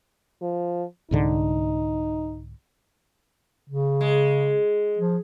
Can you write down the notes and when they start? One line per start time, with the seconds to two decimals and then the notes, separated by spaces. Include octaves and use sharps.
0.42 F3
1.11 C2 G#2 D3 D#4
3.70 C#3
4.01 G#3
4.97 F3